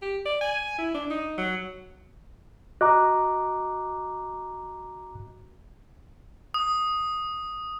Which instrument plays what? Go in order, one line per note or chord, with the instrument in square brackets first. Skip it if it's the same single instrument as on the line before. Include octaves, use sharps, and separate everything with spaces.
[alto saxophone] G4
D5
G#5
E4
D4
D#4
F#3
[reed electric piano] F#4 D#5 [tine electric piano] A#5 D6 F#6
[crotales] D#6